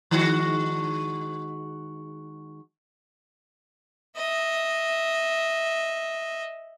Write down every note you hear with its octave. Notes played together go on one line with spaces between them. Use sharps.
D#3 G#3 F#4
D#5 E5